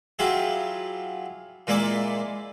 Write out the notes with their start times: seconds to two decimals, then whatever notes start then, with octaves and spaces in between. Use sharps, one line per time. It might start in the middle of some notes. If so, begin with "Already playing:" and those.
0.19 F#3 E4 F4 G4 G#4
1.67 A#2 G#3 A#3 E4 D5 D6